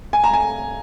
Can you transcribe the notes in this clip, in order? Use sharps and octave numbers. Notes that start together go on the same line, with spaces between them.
G#5
A#5
G#5